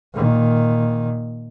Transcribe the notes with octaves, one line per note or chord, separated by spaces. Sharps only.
A#2 D#3